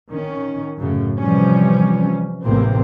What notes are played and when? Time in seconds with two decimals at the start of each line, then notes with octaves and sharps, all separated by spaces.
0.11 D#3 C#4
0.78 F#2 A2 C#3
1.18 C3 E3 F3 G3 C#4
2.44 A1 E2 C3 A#3 C4